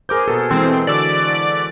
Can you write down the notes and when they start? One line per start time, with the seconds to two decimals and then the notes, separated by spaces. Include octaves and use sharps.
0.09 G#4 A#4 C5 D6 G6
0.28 B2 A4 A#4
0.51 E3 G#3 C4
0.87 D3 F#4 D5 E6